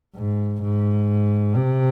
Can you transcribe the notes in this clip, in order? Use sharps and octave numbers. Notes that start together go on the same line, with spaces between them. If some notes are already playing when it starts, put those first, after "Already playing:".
G#2
G#2
C3